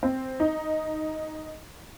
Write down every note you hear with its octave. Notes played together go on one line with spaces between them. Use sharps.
C4
D#4